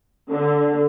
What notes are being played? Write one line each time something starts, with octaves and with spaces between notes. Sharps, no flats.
D3